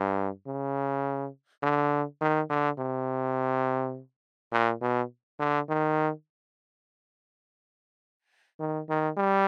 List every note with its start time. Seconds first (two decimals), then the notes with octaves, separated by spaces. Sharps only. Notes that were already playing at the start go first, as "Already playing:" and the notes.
Already playing: G2
0.47 C#3
1.63 D3
2.21 D#3
2.49 D3
2.78 C3
4.52 A#2
4.82 B2
5.39 D3
5.69 D#3
8.60 D#3
8.89 D#3
9.17 G3